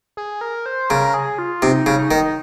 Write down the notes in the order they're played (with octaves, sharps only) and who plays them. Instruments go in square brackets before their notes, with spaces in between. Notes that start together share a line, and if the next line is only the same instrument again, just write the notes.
[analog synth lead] G#4
A#4
C5
[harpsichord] C#3 [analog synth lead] A#4
[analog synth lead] G#4
F4
[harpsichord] C3 [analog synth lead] D#4
[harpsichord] C#3
[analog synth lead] D#4
[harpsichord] D#3